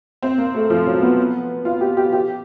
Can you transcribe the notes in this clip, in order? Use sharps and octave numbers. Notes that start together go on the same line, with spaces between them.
C4
A#3
A3
F3
F#3
B3
F4
G4
G4
G4